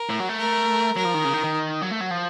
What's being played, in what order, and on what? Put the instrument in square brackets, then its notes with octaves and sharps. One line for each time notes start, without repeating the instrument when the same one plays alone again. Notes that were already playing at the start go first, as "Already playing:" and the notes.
Already playing: [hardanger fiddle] A#4
[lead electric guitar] A2
F#3
A3
[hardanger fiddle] A#4
[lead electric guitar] F#3 [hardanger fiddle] A#4
[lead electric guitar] F3
D#3
C#3
D#3
D#3
F#3
A3
F#3
F3